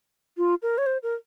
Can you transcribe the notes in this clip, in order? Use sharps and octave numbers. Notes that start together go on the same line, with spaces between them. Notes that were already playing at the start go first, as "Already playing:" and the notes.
F4
A#4
C#5
C5
A#4